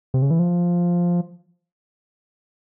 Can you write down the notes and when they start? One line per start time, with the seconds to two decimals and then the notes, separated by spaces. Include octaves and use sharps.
0.14 C3
0.22 C#3
0.31 E3
0.39 F3